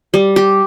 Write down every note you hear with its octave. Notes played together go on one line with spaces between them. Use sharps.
G3
G4